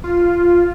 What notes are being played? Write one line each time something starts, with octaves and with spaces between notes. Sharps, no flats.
F4